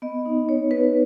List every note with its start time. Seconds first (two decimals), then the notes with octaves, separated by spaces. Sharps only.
0.02 B3 D#5
0.26 D#4
0.48 B3 C#5
0.71 D#4 B4